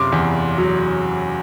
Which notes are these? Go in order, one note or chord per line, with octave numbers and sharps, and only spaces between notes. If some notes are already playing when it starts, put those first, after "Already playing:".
Already playing: F#1 C3 C6 D6
E2
F#3